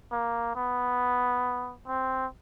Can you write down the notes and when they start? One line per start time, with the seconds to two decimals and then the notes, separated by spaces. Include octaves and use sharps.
0.12 A#3
0.56 B3
1.87 C4